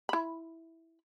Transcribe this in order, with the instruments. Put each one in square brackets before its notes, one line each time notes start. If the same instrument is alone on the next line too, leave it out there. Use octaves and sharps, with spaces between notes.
[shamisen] E4 B5